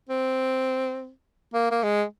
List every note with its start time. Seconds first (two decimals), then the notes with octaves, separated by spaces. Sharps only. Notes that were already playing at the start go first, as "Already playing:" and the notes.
0.09 C4
1.54 A#3
1.71 A#3
1.83 G#3